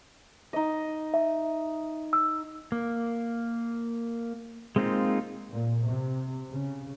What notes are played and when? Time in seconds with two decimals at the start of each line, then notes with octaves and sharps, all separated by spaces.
0.53 D#4 D#5
1.14 E5
2.13 E6
2.72 A#3
4.76 G#3 A#3 C4 D#4 F4
5.50 A#2
5.84 C3
6.50 C#3